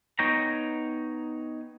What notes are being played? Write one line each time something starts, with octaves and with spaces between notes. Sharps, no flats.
B3 D#4 C#5 G5 A#5